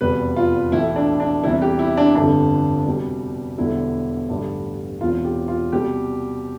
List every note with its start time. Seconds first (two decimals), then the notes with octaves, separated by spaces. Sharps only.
0.01 F1 E2 B2 G3 B4
0.36 F4
0.72 B1 A2 E3 E4
0.96 D4
1.20 D4
1.43 E2 C3 E3 G3 E4
1.62 G4
1.79 E4
1.97 D4
2.15 G1 F2 D3 G3 D4
2.86 C2 B2 G3
3.58 E1 E2 D3 G3 E4
4.29 A1 G2 D3 G3
5.01 E1 E2 C3 E3 F4
5.25 G4
5.48 F4
5.72 C2 B2 G3 G4